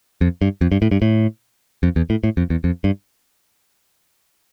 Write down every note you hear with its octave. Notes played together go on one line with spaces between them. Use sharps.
F2
G2
F2
G2
A2
G2
A2
F2
E2
A2
A2
F2
E2
F2
G2